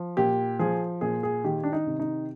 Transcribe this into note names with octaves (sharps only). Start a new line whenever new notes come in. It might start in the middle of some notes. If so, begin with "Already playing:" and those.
Already playing: F3
A#2 G4
F3 G#4
A#2 G#4
G#4
D#3 G4
D4
D#4
C3
D#4